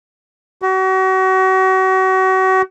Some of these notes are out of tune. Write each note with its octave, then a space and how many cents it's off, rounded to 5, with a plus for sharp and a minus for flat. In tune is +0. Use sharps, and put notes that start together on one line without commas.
F#4 +35